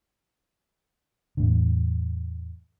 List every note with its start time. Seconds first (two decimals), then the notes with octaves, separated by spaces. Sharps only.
1.37 E2 A2 D3